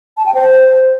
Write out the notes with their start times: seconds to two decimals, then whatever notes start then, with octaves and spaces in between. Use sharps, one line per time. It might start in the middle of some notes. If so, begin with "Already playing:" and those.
0.17 A5
0.26 G5
0.34 C5